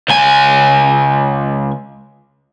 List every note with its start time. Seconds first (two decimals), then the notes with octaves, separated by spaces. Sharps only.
0.08 C#2 G#5